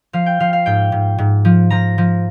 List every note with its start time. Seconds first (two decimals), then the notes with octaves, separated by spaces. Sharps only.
0.13 F3 F5
0.26 G5
0.40 F3 F5
0.53 F5
0.66 G#2 G5
0.92 G#2
1.18 G#2
1.45 F3
1.70 F3 A#5
1.98 F3